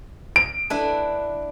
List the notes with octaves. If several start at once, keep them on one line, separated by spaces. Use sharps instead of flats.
D7
D4 E4 B4